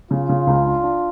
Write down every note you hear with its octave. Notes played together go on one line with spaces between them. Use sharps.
C#3 F4
C#3
C#2
D4
D4